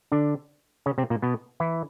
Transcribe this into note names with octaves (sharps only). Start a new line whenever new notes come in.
D3 D4
C#3 C#4
C3 C4
A#2 A#3
B2 B3
E3 E4